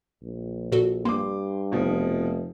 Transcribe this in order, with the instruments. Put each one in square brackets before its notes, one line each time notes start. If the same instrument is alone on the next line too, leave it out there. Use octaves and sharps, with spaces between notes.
[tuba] A#1
[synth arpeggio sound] A#2 F#4 A4
[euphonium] G2 [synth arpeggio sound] A#3 [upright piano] C6 D6
[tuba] F1 [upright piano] B2 F3